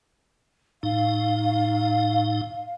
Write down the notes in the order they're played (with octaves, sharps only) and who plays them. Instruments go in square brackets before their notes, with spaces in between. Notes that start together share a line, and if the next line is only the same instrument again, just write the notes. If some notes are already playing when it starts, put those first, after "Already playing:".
[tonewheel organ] A2 D#4 [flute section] F5